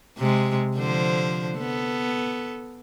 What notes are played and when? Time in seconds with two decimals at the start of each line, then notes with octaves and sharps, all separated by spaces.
0.18 C3 G#3
0.76 D3 F3 C5
1.58 B3 A4